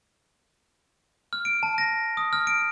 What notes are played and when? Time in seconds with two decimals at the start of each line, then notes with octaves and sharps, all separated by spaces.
1.33 F6
1.45 D7
1.63 A5
1.78 A#6
2.17 D#6
2.33 F6
2.47 D7